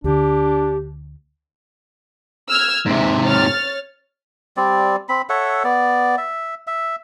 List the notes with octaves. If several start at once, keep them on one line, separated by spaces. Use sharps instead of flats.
D2 D3 D4 G4
E6 F6 G#6
G#2 C3 E5
C#5 F6 A6
G3 C4 D5
C4 B5
A4 C#5 E5 F#5
B3 D5
E5
E5